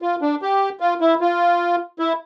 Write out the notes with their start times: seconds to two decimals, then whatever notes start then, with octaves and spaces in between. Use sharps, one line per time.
0.02 F4
0.21 D4
0.42 G4
0.80 F4
1.01 E4
1.21 F4
1.99 E4